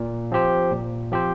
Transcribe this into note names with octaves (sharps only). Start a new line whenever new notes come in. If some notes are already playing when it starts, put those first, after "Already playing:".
Already playing: A#2
F3 C4 G4 C5
A#2
F3 C4 G4 C5